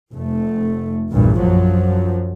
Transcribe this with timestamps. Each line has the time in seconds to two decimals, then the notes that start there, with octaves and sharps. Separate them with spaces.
0.12 F1 A3
1.11 A#1 E2 G2 A#2
1.40 F#2 F3 F#3